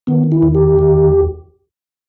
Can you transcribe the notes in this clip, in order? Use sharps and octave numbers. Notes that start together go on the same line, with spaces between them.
D#3 B3
E4
E2
G4
D#3